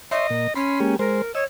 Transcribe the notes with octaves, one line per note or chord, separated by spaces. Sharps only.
C#5 D#5 E5 C6
A#2
C#4 B5 C6
G#3 A#3 G4
G#3 A#4 C5
C#5 D#5 E6